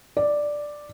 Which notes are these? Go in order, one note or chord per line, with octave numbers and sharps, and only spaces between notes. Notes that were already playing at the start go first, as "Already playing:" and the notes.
D5